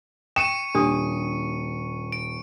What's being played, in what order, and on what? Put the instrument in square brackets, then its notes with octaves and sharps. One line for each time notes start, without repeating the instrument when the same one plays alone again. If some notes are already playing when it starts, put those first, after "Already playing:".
[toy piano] G5 [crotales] C#6 C#7 D#7 [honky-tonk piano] E7
[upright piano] D#1 [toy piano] D4 G4 D#6
[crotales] D7